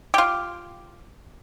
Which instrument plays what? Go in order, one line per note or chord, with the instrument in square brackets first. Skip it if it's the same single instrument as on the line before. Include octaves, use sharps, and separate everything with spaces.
[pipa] F4 G4